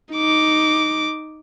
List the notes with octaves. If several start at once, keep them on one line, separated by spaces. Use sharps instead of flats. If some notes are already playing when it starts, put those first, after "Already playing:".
D#4 D6